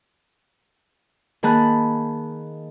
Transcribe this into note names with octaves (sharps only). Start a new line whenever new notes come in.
D#3 A#3 G#4 A5 B5 F#6